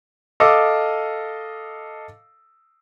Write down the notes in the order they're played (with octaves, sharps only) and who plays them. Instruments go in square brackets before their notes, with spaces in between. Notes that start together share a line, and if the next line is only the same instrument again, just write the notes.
[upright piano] A4 D#5 F5 D6 E6